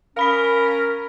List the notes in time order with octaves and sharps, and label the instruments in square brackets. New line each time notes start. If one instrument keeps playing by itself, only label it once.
[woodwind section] C#4 [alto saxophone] A#4 [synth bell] F5 B5 B6